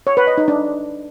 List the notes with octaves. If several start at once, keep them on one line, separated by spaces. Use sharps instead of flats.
C#5
B4
D#5
D#4
D4